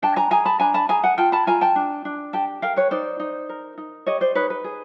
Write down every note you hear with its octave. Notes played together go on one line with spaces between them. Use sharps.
D4 G5 A5
G#5 A#5
G#4 G#5 A#5
A5 B5
D4 G#5 A#5
A5 B5
G#4 G#5 A#5
F#5 G#5
F4 G5 A5
A5 B5
F4 G#5 A#5
G5 A5
D4
D4
G4 G5 A5
A#4 F5 G5
B4 C#5
D#4 C5 D5
D#4
A#4
D#4
G4 C#5 D#5
C5 D5
D#4 B4 C#5
B4
G#4